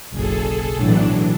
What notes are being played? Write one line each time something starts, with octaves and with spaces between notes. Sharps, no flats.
F#1 B1 G#4 A4
B1 A2 E3 F#3 D4